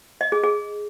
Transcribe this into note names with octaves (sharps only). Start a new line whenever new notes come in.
D#5
G#4
G#4